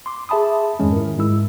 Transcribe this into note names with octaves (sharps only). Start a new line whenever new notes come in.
C6 D6
G#4 E5 A5 B5 D#6
F2 G#2 D#3 G#3 C#4
E4 A#4
G#2 G#3 E4 E6